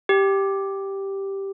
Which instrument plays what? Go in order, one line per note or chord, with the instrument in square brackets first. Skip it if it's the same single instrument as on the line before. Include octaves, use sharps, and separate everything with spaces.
[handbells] G4